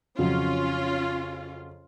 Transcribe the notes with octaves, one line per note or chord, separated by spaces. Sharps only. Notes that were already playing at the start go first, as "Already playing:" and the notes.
F2 C#3 F#3 C#4 F4